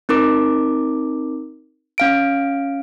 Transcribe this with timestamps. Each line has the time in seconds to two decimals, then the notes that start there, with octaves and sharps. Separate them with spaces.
0.09 C4 D#4 A#4 D6
1.98 C#4 F5 D7